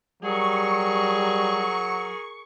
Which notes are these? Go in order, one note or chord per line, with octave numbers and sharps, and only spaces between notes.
F#3 G3 G#4 A#4 C#6